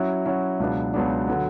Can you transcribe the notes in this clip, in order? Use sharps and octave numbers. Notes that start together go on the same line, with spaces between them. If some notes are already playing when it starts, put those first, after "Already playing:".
Already playing: F#3 C#4 E4
F#3 C#4 E4
C#2 B2 F#3 B3 D4
C#2 B2 F#3 B3 D4
D3 F#3 B3